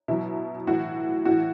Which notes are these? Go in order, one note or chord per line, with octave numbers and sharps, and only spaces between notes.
B2 F#3 E4
A2 E3 F#4
A2 E3 F#4